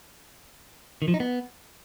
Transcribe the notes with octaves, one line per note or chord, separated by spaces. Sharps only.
D#3
F3
D#4
B3